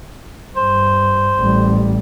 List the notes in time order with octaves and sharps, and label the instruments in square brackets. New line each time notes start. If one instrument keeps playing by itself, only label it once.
[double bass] G2 [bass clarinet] C5
[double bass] A1 G3